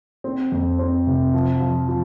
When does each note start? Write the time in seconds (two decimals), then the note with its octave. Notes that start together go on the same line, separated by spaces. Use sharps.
0.24 C4
0.52 F2
0.79 C4
1.07 C3
1.34 F3
1.60 F3
1.88 F3